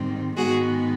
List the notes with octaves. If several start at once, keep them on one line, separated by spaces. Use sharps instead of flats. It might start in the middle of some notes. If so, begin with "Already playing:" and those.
Already playing: G#2 D#3 G3 C4
G#2 D#3 G#3 B3 F#4 G#4